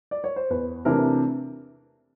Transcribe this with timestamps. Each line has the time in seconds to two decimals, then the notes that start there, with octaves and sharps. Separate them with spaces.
0.11 D5
0.24 C#5
0.36 C5
0.50 E2 B4
0.85 C3 E3 A3 D4 A#4